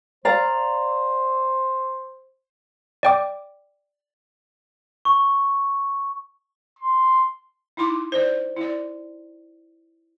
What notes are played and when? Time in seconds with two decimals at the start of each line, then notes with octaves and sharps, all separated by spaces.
0.25 C5 D5 F5 A#5
3.03 D5 G5 D6
5.05 C#6
6.79 C6
7.77 D#4 E4 C6 D6
8.12 C5 D5
8.57 E4 D5